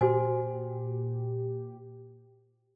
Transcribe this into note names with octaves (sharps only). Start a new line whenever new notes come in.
A#2 F#4 G4 C5 G#5